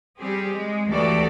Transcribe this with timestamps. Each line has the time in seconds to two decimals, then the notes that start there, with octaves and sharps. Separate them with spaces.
0.18 G3 C4 G4 G#4
0.53 G#3
0.88 D2 E3 F#4 G4 A4 D5